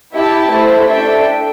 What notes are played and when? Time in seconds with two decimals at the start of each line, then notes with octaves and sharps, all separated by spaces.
0.14 E4 G4 E5 A5
0.51 A3 E4 C5
0.88 D4 A4 E5 G5